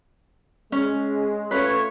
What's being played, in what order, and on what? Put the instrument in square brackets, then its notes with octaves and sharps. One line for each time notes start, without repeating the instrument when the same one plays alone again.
[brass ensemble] G#3 [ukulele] C#4
[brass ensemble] A3 F4 C#5 [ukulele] C#4 B4